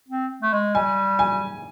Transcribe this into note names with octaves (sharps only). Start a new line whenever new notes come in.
C4
A3
G#3
G3 G#5
G#5